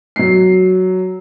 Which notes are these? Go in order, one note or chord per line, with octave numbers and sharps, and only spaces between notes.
F#3 C7